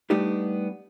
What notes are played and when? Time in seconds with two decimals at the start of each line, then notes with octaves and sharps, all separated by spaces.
0.10 G3 A3 B3 D4 D#4 G4